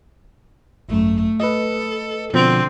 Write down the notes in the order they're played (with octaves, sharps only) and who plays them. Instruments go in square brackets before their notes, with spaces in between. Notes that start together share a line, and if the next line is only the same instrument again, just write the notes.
[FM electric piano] G#1 F#2 [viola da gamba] A3
[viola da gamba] A4 [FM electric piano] B4 D#5
[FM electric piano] B2 F3 [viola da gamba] D3 [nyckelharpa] C4